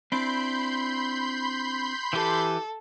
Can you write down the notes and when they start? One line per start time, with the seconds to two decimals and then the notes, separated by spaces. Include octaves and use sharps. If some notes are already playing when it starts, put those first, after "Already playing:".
0.12 C4 D4 E4 B5 C6 G6
2.13 E3 G4 A4